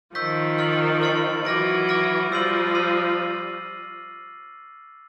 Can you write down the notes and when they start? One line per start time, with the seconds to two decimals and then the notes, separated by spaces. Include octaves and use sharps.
0.15 D#3 F3 C#6 E6 G6 B6
0.59 C#6 F6 A6 C#7 F#7
1.01 C#6 F6 A6 C#7 F#7
1.45 E3 F#3 D6 F6 A#6 D7
1.89 D6 F6 A#6 D7
2.32 F3 G3 E6 A6 C7 D#7 F#7
2.75 E6 A6 C7 D#7 F#7